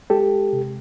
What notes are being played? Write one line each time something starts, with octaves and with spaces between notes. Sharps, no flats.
G#3 G4 A4
C3